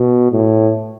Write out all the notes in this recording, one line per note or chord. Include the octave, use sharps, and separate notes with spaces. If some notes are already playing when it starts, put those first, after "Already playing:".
Already playing: B2
A2